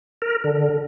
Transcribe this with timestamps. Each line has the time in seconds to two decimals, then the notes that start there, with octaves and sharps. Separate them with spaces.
0.22 A#4
0.44 D3